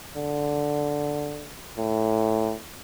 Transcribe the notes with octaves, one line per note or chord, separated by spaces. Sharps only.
D3
A2